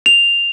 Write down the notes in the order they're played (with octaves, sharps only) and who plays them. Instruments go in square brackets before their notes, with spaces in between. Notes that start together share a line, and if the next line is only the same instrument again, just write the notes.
[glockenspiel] F7